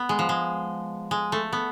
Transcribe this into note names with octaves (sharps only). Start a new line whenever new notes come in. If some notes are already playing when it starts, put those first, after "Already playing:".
Already playing: B3
G#3
F3
G#3
G#3
A3
B3